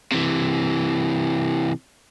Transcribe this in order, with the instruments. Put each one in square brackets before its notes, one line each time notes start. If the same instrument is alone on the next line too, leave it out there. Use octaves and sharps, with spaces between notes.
[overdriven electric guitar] C3 E3